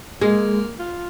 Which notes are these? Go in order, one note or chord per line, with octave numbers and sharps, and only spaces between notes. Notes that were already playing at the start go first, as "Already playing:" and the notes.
G#3 A#3
F4